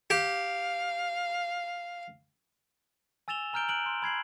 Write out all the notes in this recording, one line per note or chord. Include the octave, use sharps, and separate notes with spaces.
G4 F5
G#5 E6 A6 E7 F7 G7
G#5 A#5 F6 G6 D7 G7
F#6 D7 F#7
C6
B5 G#6 C7 F#7